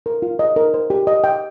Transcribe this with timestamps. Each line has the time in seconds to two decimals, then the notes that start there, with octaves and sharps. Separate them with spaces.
0.06 A#4
0.22 F4
0.39 D#5
0.56 A#4
0.74 C5
0.90 G4
1.07 D#5
1.24 G5